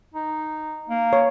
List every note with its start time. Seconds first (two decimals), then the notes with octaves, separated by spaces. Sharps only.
0.15 D#4
0.89 A#3
1.13 C#5